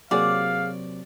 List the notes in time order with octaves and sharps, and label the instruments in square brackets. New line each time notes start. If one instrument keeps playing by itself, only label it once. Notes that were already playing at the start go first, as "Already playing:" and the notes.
[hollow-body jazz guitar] C3 F#3 A#3 [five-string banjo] F#4 G#4 [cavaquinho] D5 [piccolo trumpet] F5